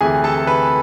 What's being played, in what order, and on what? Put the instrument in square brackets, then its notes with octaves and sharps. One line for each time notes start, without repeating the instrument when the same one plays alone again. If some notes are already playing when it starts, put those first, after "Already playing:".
[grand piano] D2 C3 E3 A3 G#4 G#5
A4 A5
B4 B5